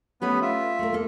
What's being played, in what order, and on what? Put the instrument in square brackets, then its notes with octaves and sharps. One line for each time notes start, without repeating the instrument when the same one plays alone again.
[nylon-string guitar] A3 C#4 G4 [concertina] B3 B4
[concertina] F4 E5
[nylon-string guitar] A3 A#4
A#3 A4